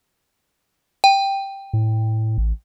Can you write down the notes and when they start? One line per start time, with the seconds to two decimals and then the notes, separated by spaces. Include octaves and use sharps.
1.04 G5
1.73 A2
2.38 A1